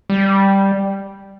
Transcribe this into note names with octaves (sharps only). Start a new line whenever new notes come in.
G3